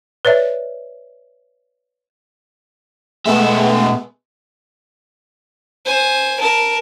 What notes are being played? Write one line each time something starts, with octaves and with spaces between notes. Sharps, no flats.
B4 C#5 D5 E5
B2 G#3 A3 B3 E5
C5 G#5
A#4 A5